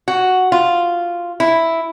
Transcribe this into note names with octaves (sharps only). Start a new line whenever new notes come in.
F#4
F4
E4